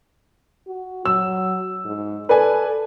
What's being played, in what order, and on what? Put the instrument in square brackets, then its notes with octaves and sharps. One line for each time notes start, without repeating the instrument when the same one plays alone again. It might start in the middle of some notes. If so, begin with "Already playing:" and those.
[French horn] F#4
[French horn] F#3 [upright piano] E6
[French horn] G#2
[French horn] A4 [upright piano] B4 D5 G#5